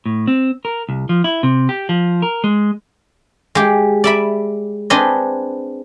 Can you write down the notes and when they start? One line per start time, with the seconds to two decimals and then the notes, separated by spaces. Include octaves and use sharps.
0.06 A2
0.27 C4
0.65 A#4
0.89 C2
1.09 F3
1.24 E4
1.43 C3
1.69 G4
1.89 F3
2.22 A#4
2.44 G#3
3.55 G#3 G4
4.04 D5 E5 B5
4.90 C4 D4 G#4 B4 D#5